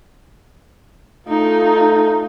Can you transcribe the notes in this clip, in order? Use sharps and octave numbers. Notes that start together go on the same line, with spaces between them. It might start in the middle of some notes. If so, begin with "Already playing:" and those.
A3 D#4 F4